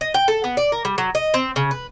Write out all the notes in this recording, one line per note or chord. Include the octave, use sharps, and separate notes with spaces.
D#5
G5
A4
B3
D5
A#4
G3
F#3
D#5
C4
C#3
B4